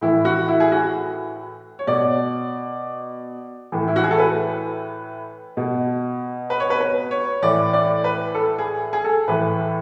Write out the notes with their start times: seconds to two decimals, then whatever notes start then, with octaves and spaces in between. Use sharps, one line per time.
0.01 A2 E3 E4
0.25 F#4
0.48 E4
0.60 G#4
0.72 F#4
1.79 C#5
1.87 B2 D5
3.72 A2 E3
3.88 E4
3.96 F#4
4.04 G#4
4.11 A4
4.18 B4
5.57 B2
6.50 B4
6.60 C#5
6.70 B4
6.80 B4
7.11 C#5
7.42 A2 E3 D5
7.73 D5
8.04 B4
8.35 A4
8.58 G#4
8.93 G#4
9.04 A4
9.27 A2 E3 B4